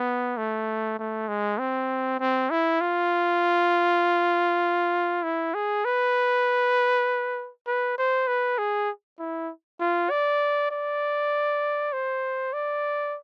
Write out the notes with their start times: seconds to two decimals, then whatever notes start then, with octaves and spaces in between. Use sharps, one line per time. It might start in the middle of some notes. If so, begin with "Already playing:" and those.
Already playing: B3
0.37 A3
0.99 A3
1.28 G#3
1.59 C4
2.20 C4
2.50 E4
2.81 F4
5.23 E4
5.54 G#4
5.85 B4
7.67 B4
7.98 C5
8.27 B4
8.58 G#4
9.19 E4
9.80 F4
10.10 D5
10.71 D5
11.93 C5
12.53 D5